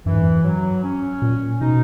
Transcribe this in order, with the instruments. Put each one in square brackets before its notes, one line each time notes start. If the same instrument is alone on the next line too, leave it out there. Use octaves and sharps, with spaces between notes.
[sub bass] F#2 [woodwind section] E3
[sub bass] G#2
F#2
[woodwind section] F#3
C#4
[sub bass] A#2
[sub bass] B2 [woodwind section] D#4